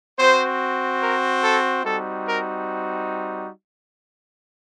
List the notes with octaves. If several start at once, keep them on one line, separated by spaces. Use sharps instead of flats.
C4 F#4 C5
A#4
A4
G3 C4 D#4 F#4 A4
A#4